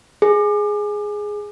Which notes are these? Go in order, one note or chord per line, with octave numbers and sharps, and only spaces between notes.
G#4